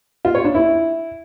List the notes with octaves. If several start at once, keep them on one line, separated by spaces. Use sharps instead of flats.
F4
C#5
D4
E4